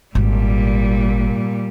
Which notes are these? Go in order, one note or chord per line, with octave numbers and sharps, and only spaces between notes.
G#1 A#2 G3